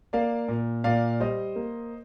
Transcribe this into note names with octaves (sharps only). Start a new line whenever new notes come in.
A#3 D5 F5
A#2
A#2 D5 F5
G3 C5 D#5
A#3